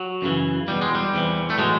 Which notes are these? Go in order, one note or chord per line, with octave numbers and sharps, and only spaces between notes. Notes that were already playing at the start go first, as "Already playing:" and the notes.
Already playing: F#3
F#2 C#3 E3
E2 B2 G3
G#3
G3
E2 C3 E3
A3
A2 E3 F#3 G#3